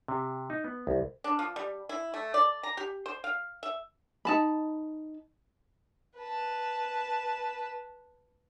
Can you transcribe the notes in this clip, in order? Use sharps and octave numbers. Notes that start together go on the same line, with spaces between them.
C3
D#4
B3
C2
D4
F3
G3
E4
A3
D5
A#5
G4
C5
F5
E5
D#4 A5 B5
B4 A5